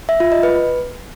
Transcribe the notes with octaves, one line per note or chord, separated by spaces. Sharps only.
E5
F4
D#5
B4